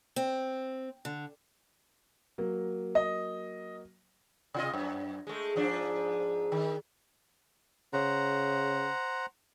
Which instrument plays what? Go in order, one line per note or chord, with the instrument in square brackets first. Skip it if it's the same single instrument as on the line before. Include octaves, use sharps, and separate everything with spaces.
[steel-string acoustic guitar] C4
D3
[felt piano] F#3 A#3
[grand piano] D#5
[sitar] C3 F4 D#5
F#2
G#3 A3
G#2 F3 D4
D#3
[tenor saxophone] C#3 [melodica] C5 F#5 A#5